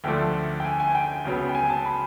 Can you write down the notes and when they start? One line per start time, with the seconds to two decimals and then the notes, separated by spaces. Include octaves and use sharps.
0.04 D2 D3 F3 A3 D4 G5
0.60 G5
0.65 G#5
0.80 G#5
0.95 G5
1.25 C#2 C#3 F#3 B3
1.49 G5
1.55 G#5
1.70 A5
1.85 B5